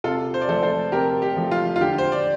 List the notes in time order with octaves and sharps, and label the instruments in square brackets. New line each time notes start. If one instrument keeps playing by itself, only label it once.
[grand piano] C3 F4 A4
C5
D5
F3 A3 A4 C5
A4 C5
C3 G4 A#4
G4
F3 A3
F4
F4
D3 G4
C5
D5